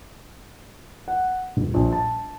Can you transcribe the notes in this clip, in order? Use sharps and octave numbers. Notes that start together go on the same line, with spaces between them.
F#5
D#1
A#1
A5